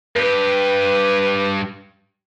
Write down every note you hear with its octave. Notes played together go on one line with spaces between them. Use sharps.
G2 G4 B4